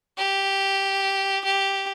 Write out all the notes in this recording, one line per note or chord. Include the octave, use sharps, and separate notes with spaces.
G4
G4